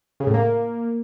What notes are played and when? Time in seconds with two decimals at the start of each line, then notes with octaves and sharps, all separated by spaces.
0.20 C#3
0.27 A2
0.34 A#3